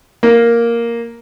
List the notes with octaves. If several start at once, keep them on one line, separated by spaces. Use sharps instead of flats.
A#3